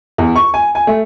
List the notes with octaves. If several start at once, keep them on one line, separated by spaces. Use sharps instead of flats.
E2
C#6
G#5
G#5
A3